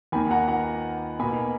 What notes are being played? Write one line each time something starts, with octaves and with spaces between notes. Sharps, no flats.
D#2 D#3 A#3 G#5 B5
F#5 A#5
F#5 A#5
B2 A#3 G#5 B5